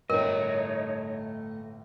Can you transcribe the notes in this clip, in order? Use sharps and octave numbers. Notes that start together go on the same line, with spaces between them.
G1 A2 A3 D#4 A#4 C#5 D#5 G5